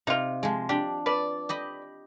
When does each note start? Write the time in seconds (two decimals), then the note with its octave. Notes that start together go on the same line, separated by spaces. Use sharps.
0.07 C3 D#4 F4
0.43 F3 G#3
0.69 D4 G4
1.06 B4 D5 A5
1.49 G4 D#5 B5